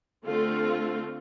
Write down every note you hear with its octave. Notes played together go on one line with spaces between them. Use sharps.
D3 A3 C4 F4 A4